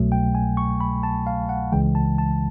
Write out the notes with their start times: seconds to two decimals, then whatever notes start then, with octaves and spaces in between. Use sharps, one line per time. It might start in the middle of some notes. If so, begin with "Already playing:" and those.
Already playing: C2 B2 F#3 A3
0.12 G5
0.35 G#5
0.57 C#6
0.81 B5
1.03 A5
1.27 F5
1.49 F#5
1.72 C#2 C#3 E3 G#3 G5
1.95 A5
2.18 A5